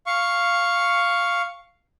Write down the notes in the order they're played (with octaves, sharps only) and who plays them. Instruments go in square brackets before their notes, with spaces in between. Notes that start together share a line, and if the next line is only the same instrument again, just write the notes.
[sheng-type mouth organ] F5 C#6